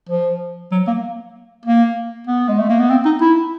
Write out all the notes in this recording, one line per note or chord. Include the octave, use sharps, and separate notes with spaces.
F3
F#3
A#3
A#3
B3
G#3
A3
A#3
B3
C4
D#4
E4